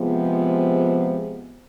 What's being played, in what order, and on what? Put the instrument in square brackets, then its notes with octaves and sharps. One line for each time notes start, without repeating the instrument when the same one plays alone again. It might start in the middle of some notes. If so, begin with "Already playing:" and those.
Already playing: [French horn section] C3 F3 G#3 B3